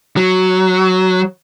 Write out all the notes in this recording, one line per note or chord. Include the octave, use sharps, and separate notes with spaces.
F#3